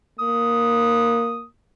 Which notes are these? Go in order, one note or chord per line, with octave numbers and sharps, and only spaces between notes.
A#3 D#6